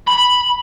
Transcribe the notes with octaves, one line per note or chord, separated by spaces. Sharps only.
B5